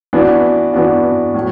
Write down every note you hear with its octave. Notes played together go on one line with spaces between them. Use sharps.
E3 B3 D4 F#4
E3 B3 D4 F#4
A2 F#3